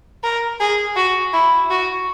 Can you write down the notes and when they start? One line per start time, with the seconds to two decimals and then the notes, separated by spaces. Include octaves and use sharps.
0.24 A#4
0.60 G#4
0.96 F#4
1.33 E4
1.70 F#4